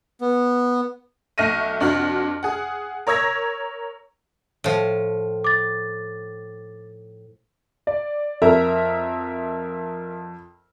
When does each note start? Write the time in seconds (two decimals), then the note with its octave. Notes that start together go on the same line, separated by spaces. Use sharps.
0.21 B3
1.38 B1 A3 F6 A#6 D#7
1.81 F2 D4 F#4 F6
2.43 G#4 F#5
3.07 A#4 C#5 E6 G#6 A#6
4.64 A2 F3
5.44 D6 A6
7.87 D5
8.42 F2 A#4 E5 A#5